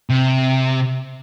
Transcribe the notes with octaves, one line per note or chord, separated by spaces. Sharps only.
C3